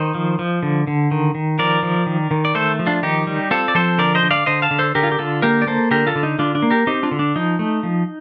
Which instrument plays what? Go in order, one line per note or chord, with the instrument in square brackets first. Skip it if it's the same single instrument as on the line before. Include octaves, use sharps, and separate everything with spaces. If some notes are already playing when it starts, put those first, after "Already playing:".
Already playing: [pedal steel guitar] D#3 C5 D#5
F3
F3
D3
D3
D#3
D#3
F3 A#4 D5
F3
D#3
D#3
D5
A3 A4 C5
F3
D4 F4
D#3 D#4 G4
G3
C4 F4 A4
D5
F3 A4 C5
D3 A#4 D5
C5 D#5
D3
D5 F5
D3 C5 D#5
F5 A5
D3
A4 C5
D3 G4 A#4
F4
G4
D3 F4 A4
A#3 G4 A#4
D5
A#3 A4 C5
D3 G4 A#4
F4 A4
D3
D#4
D3 D4 F4
D4
A#3
G4 A#4
C4 D#4 G4
D4 F4
D3
D4
F3 D#4
A3
F3